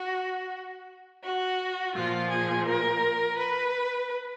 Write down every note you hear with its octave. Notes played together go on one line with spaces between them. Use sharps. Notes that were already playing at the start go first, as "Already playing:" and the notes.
Already playing: F#4
F#4
A#2 F3 F4
G#4
A#4
B4